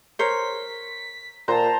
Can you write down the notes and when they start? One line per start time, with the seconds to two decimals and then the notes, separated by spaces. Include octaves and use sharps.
0.19 A#4 C5 C#5 B6
1.48 A#2 C5 A5 A#5